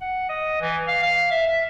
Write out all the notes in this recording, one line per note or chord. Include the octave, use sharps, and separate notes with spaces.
F#5
D#5
E3
F5
F5
E5
E5